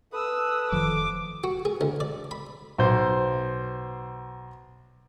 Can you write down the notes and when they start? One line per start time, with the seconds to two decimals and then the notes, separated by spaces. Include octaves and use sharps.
0.13 A4 B4 D#6 E6
0.72 F1 D#3 F3 D6
1.44 F#4
1.65 G#4
1.81 D2
2.00 D5
2.31 B5
2.78 B1 C5